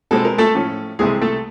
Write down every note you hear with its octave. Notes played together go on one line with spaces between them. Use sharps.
B2 G#3 C4 A4
A#4
A3 A4
A2 F3 A3 C#4
C2 C3 E3 G#3 A3 G#4
A3 A4